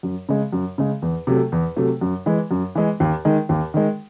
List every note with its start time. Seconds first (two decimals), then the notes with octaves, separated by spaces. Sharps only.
0.03 F#2
0.29 C#3 G#3
0.53 F#2
0.78 C#3 G#3
1.02 E2
1.27 C3 F#3 A3
1.52 E2
1.76 C3 F#3 A3
2.01 F#2
2.26 E3 G#3
2.51 F#2
2.75 E3 G#3
3.00 D#2
3.25 D#3 G#3
3.49 D#2
3.74 D#3 G#3